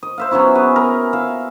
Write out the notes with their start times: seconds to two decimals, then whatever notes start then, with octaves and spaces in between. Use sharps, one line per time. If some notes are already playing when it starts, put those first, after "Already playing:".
0.03 D#5
0.18 C5 E5 F5
0.31 F#3 B3 C#4 E4
0.55 G#4 B4
0.76 A#4
1.13 E5 F5